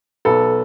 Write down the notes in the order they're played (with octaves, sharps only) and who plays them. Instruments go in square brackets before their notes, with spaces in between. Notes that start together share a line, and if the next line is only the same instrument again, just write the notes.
[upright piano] B1 A4 B4